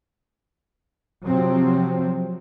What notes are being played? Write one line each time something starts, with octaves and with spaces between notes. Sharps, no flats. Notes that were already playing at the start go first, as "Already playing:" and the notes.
C3 F3 F#3 C4